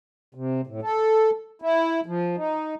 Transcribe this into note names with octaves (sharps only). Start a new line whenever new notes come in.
C3
A2
A4
E4
F3
D#4